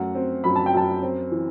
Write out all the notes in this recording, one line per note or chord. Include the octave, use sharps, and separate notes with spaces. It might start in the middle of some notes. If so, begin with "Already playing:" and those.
Already playing: F#2 A3 F#5
C4
F#2 B5
A5
G5
F#2 A5
C4
E3